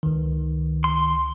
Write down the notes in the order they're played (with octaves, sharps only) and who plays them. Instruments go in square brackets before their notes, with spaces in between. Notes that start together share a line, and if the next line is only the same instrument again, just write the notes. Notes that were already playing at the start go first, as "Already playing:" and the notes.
[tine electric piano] C#2 D#3
[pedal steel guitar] C6